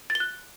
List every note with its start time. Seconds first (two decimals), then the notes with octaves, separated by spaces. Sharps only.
0.10 A6
0.15 G7
0.20 F#6